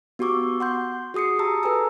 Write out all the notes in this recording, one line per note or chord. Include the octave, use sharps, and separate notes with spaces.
B3 F#4 G4 C#6 D6 E6
F#5 C6 G6
F#4 G#4 D#6 C7 C#7
G4 A5 A#5 D#6 E6
A4 B4 G#5 A#5 E6